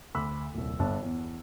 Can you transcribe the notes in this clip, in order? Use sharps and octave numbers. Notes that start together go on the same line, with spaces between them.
D2 B5 C6 D6 E6
D#1 C2
G1 G2 A5
E2